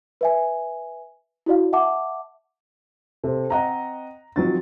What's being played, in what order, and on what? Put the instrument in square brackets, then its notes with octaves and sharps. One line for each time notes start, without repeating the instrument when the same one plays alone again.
[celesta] B4 E5 G#5
E4 F#4 D5 F5
E5 F#5 A5 D6
[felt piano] C3 [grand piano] A4 C5
[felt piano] C4 D#5 F#5 [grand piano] A#5
[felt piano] D#3 F#3 [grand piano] F3 C4 A6